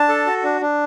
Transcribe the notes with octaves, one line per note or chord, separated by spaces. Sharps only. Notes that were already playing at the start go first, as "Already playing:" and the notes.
Already playing: D4 A5
A4
F#4
D4
D4